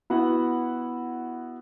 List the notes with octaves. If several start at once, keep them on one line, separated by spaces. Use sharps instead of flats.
B3 E4 F#4 F#5